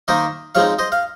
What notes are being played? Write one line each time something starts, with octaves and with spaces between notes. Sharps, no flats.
D#3 A#3 D#4 C5 D#5
F3 G#3 C4 D#4 C#5 F5
C5 D#5
F5